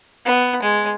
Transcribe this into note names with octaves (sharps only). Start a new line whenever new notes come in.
B3
G#3